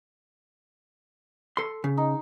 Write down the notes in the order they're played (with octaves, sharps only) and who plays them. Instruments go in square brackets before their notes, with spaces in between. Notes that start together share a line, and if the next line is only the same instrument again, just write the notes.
[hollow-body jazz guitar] A4 C6
C#3
[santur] D#4